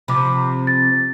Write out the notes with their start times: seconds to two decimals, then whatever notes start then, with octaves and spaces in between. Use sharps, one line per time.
0.08 C3 F3 B5 D6
0.67 A6